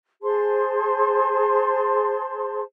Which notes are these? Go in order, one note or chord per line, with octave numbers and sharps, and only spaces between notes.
G#4 C5 A5 C6